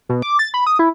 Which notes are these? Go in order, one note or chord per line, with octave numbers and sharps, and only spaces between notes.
B2
D6
A6
B5
D#6
E4